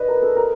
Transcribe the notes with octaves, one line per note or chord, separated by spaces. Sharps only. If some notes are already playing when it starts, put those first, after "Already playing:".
Already playing: B4 D5 D#5
A#4
A4
A#4